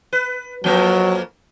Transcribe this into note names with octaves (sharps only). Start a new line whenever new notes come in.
B4
F2 F#3 A#3 A#4